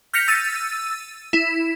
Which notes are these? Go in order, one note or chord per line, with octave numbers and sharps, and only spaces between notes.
F6 G6 A#6 B6 C#7 F7
E6 A6 D#7
E4